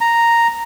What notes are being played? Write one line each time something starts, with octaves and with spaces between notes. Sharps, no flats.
A#5